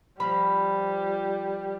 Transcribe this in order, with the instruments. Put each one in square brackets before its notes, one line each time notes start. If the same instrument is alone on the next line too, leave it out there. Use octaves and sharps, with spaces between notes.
[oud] F3 [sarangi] G3 [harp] B5